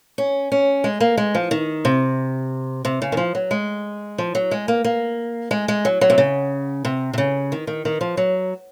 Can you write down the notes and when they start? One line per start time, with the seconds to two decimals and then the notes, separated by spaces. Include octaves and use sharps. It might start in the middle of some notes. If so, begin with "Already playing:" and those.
0.18 C#4
0.52 C#4
0.84 G#3
1.00 A#3
1.17 G#3
1.35 F3
1.51 D#3
1.85 C3
2.85 C3
3.02 C#3
3.12 D#3
3.17 F3
3.35 F#3
3.51 G#3
4.18 F3
4.35 F#3
4.51 G#3
4.68 A#3
4.84 A#3
5.51 G#3
5.68 G#3
5.85 F#3
6.01 F#3
6.10 C3
6.18 C#3
6.85 C3
7.13 C3
7.18 C#3
7.52 D#3
7.67 D#3
7.85 D#3
8.01 F3
8.17 F#3